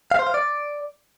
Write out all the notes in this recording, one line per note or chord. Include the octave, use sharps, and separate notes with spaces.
F5
C5
F5
D5